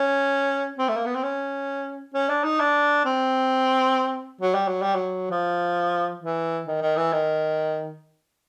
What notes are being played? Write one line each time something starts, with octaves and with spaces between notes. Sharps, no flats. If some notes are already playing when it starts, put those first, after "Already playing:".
Already playing: C#4
C4
A3
A#3
B3
C4
C#4
C#4
D4
D#4
D4
C4
F#3
G3
F#3
G3
F#3
F3
E3
D#3
D#3
E3
D#3